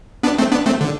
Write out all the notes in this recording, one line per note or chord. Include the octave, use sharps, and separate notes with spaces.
B3 D4
A3 C4
B3 D4
A3 C4
D3